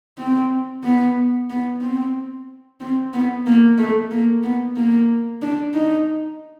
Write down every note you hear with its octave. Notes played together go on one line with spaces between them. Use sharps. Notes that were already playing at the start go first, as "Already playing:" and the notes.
C4
B3
B3
C4
C4
B3
A#3
A3
A#3
B3
A#3
D4
D#4